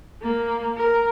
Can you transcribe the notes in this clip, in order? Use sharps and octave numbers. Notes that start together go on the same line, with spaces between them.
A#3
A#4